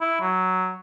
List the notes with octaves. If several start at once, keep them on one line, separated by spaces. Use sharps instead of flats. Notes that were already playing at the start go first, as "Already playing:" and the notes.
E4
F#3